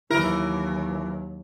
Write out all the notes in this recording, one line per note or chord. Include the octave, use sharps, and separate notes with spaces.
D#2 E3 F#3 E4 A#4